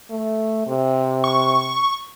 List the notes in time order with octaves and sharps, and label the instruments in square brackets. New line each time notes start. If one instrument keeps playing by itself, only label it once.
[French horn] A3
C3
[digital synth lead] C#6